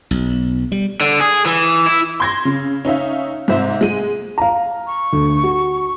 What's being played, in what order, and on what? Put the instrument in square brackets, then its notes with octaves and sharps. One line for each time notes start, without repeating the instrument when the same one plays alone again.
[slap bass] B1
G3
[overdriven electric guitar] D3
G#4
E3
E4
[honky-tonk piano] C6 G#6 A#6
C#3
C#4 D#4 E5 F5
G#2 C3 C5 E5
G#3 D#7
[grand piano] F5 A#5
[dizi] C#6
[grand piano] D2
F#4